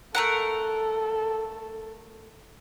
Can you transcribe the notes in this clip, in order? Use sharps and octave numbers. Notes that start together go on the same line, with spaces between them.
A3 A4 A#4 F#5